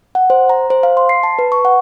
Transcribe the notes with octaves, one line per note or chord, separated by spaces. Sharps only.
F#5
C5
A#5
C5
F5
C6
C7
A5
B4
C#6
F#5